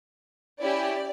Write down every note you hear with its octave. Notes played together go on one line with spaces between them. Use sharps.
C#4 E4 G4 D5